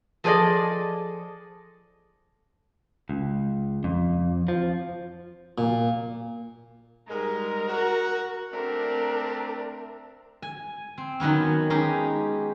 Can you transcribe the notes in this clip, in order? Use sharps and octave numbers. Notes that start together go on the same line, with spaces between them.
F3 G#4 A4 B4 D5 D#5
C#2
F2
F3
A#2
G#2 G3 G#3 A#4
F#4
A3 C4 D4 A#4
G#5
C4
D#3 F#3 B3 C#4
G#3 C#4 D#4 G4 G#4